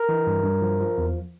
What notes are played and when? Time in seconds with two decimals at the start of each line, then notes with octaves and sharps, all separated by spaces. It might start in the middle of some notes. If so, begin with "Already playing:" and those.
Already playing: A#4
0.09 E3
0.27 G2
0.44 G2
0.62 F3
0.80 F3
0.98 E2